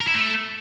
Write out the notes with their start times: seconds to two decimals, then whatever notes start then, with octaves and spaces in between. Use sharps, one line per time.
0.01 A#4
0.08 E4
0.14 A3